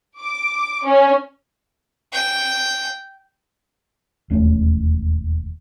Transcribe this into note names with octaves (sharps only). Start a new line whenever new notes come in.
D6
C#4
G5
E1 D#2 A3 C#4